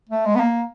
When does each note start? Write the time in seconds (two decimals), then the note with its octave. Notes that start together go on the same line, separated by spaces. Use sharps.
0.09 A3
0.25 G#3
0.35 B3
0.40 A#3